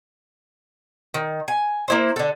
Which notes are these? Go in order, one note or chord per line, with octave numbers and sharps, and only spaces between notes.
D#3
G#5
A#3 E4 C5
D3 A4